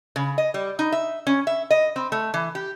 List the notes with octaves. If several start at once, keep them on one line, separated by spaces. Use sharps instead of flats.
C#3
D#5
G3
D#4
E5
C#4
E5
D#5
C4
A3
E3
G4